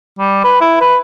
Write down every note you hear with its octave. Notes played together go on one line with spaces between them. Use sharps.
G3
B4
E4
B4